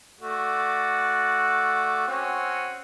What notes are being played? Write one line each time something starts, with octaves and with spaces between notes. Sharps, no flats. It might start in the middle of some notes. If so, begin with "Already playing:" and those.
A3 F#4 D5
C4 C#4 F#4